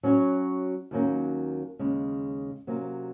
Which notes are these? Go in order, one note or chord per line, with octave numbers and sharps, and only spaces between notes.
F#3 C#4 F#4 C#5
D#2 D#3 F#3 A#3 C#4
D#2 C#3 G#3
C3 F#3 A#3 C#4